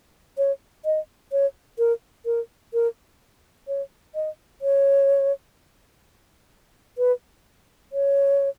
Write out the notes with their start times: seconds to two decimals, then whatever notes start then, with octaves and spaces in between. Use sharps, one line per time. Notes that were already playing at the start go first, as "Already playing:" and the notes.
0.38 C#5
0.85 D#5
1.32 C#5
1.78 A#4
2.26 A#4
2.74 A#4
3.68 C#5
4.15 D#5
4.62 C#5
6.98 B4
7.93 C#5